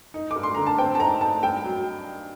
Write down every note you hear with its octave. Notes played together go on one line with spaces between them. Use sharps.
D#4
D6
G2
C6
D3 A#5
A5
C4 G5
A5
D#4 A#5
D#4 A5
G2 G5
F#3